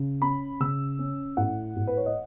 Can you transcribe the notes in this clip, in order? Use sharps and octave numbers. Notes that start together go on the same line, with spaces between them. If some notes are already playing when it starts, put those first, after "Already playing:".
Already playing: C#3
C#4 B5
C#3 E6
C#4
A2 F#5
A2
B4
C#5
D#5